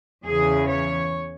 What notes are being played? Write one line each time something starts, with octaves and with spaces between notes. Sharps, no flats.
E2 C#3 E3 G#4
C#5